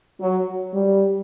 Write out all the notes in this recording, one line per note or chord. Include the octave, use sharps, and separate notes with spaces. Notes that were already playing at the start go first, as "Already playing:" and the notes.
F#3
G3